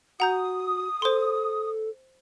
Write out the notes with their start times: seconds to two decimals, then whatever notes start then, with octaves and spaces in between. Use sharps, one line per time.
0.20 F#4 F#5 A#5 D#6 G6
1.02 A4 C5 C6